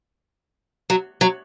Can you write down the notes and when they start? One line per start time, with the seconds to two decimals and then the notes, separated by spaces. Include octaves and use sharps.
0.90 F#3
1.21 F#3